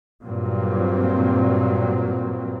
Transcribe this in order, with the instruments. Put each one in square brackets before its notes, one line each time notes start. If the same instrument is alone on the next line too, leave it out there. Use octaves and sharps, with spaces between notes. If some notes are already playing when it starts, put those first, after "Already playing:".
[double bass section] G2 A#2 F#3 C4